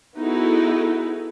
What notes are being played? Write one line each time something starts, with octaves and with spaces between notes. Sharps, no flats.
B3 D#4 E4 F#4 G#4 A4